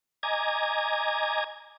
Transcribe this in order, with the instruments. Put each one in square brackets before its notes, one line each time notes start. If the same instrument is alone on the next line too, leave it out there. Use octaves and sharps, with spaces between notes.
[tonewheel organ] D#5 G#5 A#5 D6 G#6